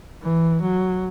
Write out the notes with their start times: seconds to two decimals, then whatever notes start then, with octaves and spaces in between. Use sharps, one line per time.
0.22 E3
0.62 F#3